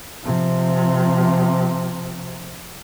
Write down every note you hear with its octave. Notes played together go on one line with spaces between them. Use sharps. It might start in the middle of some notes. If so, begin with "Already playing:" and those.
C3 F3